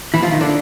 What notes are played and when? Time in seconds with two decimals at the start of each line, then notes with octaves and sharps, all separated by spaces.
0.14 E3 E4
0.22 F3 F4
0.31 D#3 D#4
0.41 D3 D4